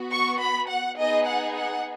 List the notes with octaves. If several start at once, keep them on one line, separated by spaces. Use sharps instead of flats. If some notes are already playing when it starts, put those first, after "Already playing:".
Already playing: B3 F#4
C#6
B5
F#5
B3 D#4 G#4 D#5
F#5
F#5